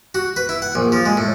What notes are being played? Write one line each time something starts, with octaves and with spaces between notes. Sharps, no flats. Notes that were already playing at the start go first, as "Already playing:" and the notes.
F#4
B4
E4
F#5
A#1
F3
G#3
A2